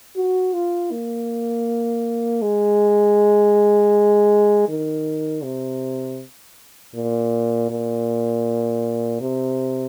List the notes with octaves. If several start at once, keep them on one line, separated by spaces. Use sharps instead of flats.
F#4
F4
A#3
G#3
D#3
C3
A#2
A#2
C3